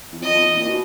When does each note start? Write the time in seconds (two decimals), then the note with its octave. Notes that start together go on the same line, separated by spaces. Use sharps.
0.12 E2
0.22 F2 D#5
0.34 F2
0.45 E2
0.57 A#2
0.68 B2